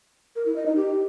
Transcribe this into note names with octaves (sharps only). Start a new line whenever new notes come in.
A#4
E4
D#5
D#4
G4